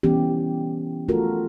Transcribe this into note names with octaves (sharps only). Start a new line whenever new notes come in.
E3 B3 C#4 G4
A3 F4 F#4 A4 A#4